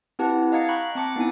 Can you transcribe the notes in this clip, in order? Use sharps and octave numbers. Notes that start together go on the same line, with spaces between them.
C4 E4 G4 B4 F#5 A5
D#5 F5 A#5 G#6 A6 C#7
G5 A#5 B5 C#6 F#6 G6
C4 A5 D6 C#7
B3 D#4 E4 G#5